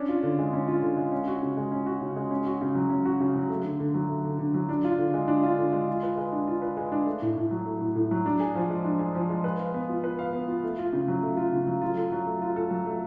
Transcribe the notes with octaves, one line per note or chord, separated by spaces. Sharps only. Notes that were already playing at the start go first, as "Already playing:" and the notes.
Already playing: C#4 D4
F4
D3
G#3
C#4
F4
D3
G#3
C#4
F#4
C#3
G#3
C#4
F#4
C#3
G#3
C#4
F#4
C#3
F#3
C#4
F#4
C#3
F#3
A3
D3
D3
F#3
A3
D3
D3
F#3
D4
F4
D3
G#3
D4
F4
D3
G#3
F4
B4
G#3
D4
F4
B4
G#3
D4
A3
A2
A2
F#3
A3
A2
A2
F#3
D4
G#4
F3
G#3
D4
G#4
F3
G#3
B4
F5
B3
F4
B4
F5
B3
F4
A3
F4
C#3
F#3
A3
F4
C#3
F#3
F4
A4
F#3
A3
F4
A4
F#3
A3